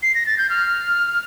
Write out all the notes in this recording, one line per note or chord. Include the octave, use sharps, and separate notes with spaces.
C7
A#6
A6
G6
F6